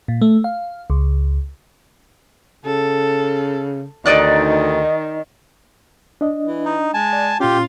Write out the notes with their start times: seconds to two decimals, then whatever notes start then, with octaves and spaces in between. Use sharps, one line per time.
0.08 A#2
0.21 A3
0.44 F5
0.90 C#2
2.65 C#3 A4
4.06 D2 D#3 D#4 D5 F#6
6.21 D4 D#5
6.46 E3
6.66 D#4
6.94 G#3 G#5 A5
7.13 D5
7.40 A#2 C#4 F4 G4